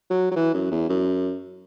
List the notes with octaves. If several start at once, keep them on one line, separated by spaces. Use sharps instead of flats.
F#3
F#3
E3
F#2
E2
F#2